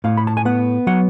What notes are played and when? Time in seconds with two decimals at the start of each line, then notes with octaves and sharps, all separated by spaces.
0.04 A2 F5
0.17 B5
0.27 A5
0.37 G#5
0.45 B3 F#5
0.87 F#3 F#5